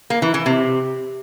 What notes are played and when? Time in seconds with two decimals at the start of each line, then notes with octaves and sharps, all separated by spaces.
0.10 A#3
0.22 E3
0.34 E3
0.46 C3